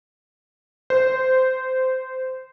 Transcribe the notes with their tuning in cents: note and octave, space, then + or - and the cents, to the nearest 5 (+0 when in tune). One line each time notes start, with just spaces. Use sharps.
C5 -15